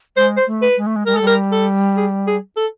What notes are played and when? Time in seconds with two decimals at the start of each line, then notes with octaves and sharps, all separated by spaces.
0.17 G#3 C5
0.37 C5
0.47 A3
0.62 B4
0.77 G#3
0.87 A3
0.96 G#3
1.07 G3 A#4
1.14 G#3
1.16 A4
1.22 G3
1.27 A#4
1.52 A4
1.97 G#4
2.27 G#4
2.57 A4